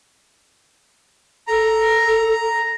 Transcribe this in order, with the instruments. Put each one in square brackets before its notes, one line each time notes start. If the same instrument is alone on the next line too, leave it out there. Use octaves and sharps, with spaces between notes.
[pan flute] A4 [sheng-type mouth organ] A#5